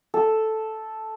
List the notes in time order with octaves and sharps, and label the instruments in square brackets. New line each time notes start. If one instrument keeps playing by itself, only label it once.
[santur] A4